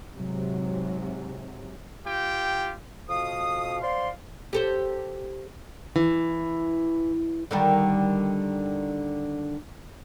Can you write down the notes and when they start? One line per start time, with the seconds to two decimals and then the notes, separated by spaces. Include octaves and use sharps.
0.16 G#2 C3 F#3
2.05 F4 G4 G5
3.09 F2 B2 F5 D#6
3.82 C5 D5 F5 C6
4.53 G4 A4 C5
5.96 E3
7.51 D3 D#3 G3